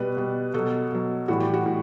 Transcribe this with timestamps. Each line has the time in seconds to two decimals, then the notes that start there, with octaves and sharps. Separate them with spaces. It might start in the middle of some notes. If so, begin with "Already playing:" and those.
Already playing: B2 G3 B4
0.17 B2 G3
0.54 B2 F#3 A4
0.92 B2 F#3
1.28 A2 E3 G3 F#4
1.40 G4
1.54 F#4
1.66 A2